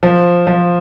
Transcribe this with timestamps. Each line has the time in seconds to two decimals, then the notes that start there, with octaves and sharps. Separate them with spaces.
0.03 F3
0.47 F3